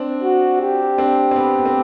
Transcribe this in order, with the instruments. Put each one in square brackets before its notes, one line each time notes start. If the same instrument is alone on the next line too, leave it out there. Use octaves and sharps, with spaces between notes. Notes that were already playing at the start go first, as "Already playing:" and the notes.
Already playing: [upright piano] C4 D4
[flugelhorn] F#4
G4
[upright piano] C4 D4
C4
B3
B3
C4